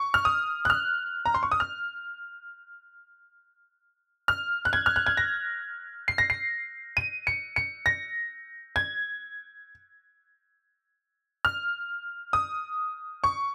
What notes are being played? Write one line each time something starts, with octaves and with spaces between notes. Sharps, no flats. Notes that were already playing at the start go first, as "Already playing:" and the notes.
Already playing: C#6
F6
D#6
F#6
F6
A#5
C6
C#6
D#6
F6
F6
F#6
G#6
F6
F#6
G#6
A#6
C7
A#6
C7
D#7
C#7
C#7
A#6
G#6
F6
D#6
C#6